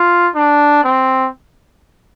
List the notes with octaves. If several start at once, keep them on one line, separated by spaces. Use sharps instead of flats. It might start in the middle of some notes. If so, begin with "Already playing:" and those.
Already playing: F4
D4
C4